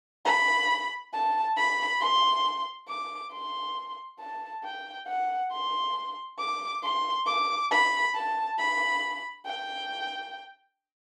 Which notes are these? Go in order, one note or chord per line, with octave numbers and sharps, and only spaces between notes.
B5
A5
B5
C6
D6
C6
A5
G5
F#5
C6
D6
C6
D6
B5
A5
B5
G5